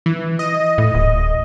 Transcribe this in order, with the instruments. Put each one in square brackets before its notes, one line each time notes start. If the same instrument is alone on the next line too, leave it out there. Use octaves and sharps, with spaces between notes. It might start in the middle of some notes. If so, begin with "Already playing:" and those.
[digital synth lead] E3
D#5
[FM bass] A2
D1